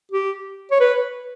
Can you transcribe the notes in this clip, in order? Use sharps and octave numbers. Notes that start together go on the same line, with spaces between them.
G4
C#5
B4